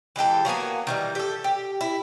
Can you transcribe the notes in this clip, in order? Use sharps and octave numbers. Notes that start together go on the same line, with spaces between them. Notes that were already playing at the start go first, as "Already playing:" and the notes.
E3 G#3 G4 A4
F#3 A#3 B3 G#5
D#3 E3 G3
G4 A4
G4
E4